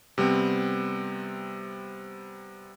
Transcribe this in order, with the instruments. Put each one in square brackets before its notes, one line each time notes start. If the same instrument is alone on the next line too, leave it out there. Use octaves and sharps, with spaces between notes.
[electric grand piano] C3 G3 B3 C4